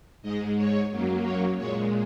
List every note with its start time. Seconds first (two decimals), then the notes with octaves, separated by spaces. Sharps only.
0.22 G#2 G#3 D#5
0.56 C#5
0.89 F#2 F#3 A#3
1.24 C#5
1.57 A#2 G#3 C#5